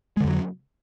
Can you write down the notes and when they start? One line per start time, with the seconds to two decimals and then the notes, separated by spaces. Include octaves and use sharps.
0.17 G#3
0.21 D3
0.24 F2
0.28 F#3